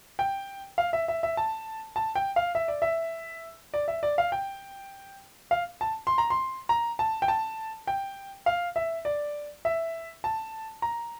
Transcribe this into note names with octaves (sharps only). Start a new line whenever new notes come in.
G5
F5
E5
E5
E5
A5
A5
G5
F5
E5
D5
E5
D5
E5
D5
F5
G5
F5
A5
C6
A#5
C6
A#5
A5
G5
A5
G5
F5
E5
D5
E5
A5
A#5